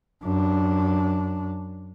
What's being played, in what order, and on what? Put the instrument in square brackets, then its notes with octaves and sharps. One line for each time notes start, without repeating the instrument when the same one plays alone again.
[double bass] F#2 D4